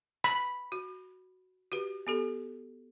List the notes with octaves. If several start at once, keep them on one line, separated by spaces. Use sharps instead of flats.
B5
F#4
F#4 G4 B4
B3 G4 A4